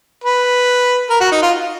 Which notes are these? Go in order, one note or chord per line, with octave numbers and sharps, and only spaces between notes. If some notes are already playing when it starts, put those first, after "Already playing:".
B4
A#4
F#4
D#4
F4